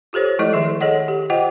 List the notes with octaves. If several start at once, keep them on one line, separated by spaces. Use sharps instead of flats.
F4 G4 A4 C5 C#5
F3 G#3 A3 E4 A4 D#5
D#3 G#4 E5
G#4 A4 C#5 D#5 F#5
G4
F4 C5 D#5 F#5 G5